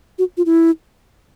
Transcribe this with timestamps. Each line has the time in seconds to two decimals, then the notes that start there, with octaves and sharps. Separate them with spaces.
0.19 F#4
0.37 F4
0.46 E4